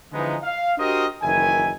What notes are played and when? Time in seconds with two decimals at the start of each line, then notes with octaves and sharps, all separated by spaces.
0.13 D3 E3 F3 G#3 B3 D#4
0.42 F5
0.78 D4 F#4 G4 A#4 C5 D#5
1.22 F#1 D#3 E3 E4 G#5